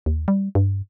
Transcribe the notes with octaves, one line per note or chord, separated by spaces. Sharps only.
D#2
G3
G2